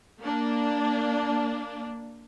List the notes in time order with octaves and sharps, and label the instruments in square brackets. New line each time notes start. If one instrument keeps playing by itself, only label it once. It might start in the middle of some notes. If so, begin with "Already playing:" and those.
[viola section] A#3 D4